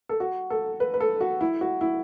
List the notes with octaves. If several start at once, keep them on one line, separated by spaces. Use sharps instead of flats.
A4
F#4
A4
B4
B4
A4
F#4
E4
F#4
E4